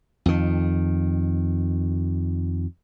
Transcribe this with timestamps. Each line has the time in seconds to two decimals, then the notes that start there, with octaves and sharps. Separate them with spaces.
0.26 F2 D#3